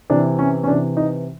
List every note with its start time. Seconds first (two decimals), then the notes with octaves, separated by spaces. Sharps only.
0.10 C3 E3 D4
0.39 C#4
0.64 C#4
0.67 C3 E3 D4
0.97 D#4